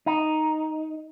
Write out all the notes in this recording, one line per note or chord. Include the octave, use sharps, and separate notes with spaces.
D#4